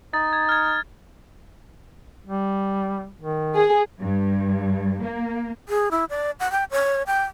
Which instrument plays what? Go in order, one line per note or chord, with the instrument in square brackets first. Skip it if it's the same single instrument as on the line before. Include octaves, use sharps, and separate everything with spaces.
[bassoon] D#4 [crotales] A6
[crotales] G#6
F6 G#6
[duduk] G3
D#3
[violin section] G#4
[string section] G2
A#3
[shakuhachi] G#4
E4
D5
F#5
G5
C#5
G5